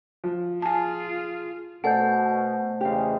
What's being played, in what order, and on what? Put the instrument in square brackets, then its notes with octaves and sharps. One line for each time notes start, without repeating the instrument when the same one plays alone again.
[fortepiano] F3
[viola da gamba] F4 G#4 [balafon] G#5 A5
[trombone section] B2 [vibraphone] A3 C5 [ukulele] A4 D5 [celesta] F#5 G#5 G6
[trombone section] E2 C#3 G#3 [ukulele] G4 F5